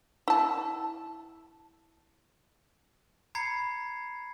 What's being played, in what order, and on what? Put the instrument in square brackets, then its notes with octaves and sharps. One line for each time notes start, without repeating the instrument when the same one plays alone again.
[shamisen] E4 A5
[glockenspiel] A#5 B5 G#6 C7 C#7